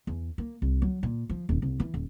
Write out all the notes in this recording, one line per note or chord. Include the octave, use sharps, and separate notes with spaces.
E2
A#3
C2
F#3
A#2
F3
D#1
C2
E3
D#1